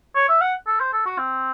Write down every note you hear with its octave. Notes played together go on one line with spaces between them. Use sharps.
C#5
E5
F#5
A4
C5
A4
F#4
C4